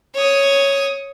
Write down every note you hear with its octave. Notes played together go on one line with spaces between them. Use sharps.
C#5 D#6